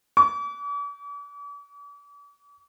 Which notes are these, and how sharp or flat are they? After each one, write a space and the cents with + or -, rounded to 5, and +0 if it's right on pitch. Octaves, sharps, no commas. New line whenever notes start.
D6 -45